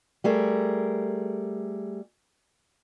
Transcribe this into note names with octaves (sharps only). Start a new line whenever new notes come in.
G3 A3 G#4 A#4